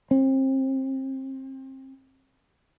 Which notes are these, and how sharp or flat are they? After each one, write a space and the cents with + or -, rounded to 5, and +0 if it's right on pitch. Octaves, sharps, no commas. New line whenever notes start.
C4 +30